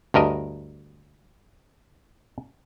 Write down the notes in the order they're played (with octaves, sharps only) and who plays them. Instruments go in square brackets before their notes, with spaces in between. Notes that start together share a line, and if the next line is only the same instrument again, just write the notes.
[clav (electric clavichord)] D2 G2 A#4 D#5